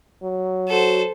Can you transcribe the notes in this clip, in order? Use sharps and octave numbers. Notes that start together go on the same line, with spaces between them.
F#3
F#4 A4 C5